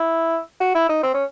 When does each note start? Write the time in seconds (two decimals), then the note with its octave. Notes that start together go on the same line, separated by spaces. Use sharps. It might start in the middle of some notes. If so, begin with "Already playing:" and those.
Already playing: E4
0.60 F#4
0.75 E4
0.89 D#4
1.03 C4
1.14 C#4